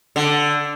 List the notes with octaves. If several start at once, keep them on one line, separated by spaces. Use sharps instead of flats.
D3